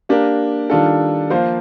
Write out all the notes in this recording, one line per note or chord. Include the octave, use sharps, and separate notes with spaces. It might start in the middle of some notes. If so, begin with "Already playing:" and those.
A#3 D4 G4 A#4
D#3 G3 D4 F4 A4
F3 A#3 F4 C5